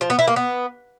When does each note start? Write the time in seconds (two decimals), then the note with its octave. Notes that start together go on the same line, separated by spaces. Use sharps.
0.01 F3
0.10 B3
0.19 E4
0.27 A#3
0.36 B3